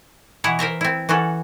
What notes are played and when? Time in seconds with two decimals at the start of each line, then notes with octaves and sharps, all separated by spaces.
0.44 B2 E3 E4 C#5 F#5
0.59 A#4 C5 E5 A#5
0.81 C4 E4
1.09 E3 C#4 F#4 A4